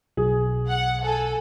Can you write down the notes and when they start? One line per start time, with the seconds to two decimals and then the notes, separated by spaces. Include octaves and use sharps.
0.17 B1 G#4
0.70 F#5
1.05 A4 G#5